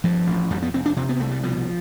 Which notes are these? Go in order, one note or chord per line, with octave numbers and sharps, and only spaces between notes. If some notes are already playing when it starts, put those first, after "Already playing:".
G2 F3
A1
F2 G3
B3
F1 C4
D4
C3 C4
B3
C2 A3
G3
B2 F3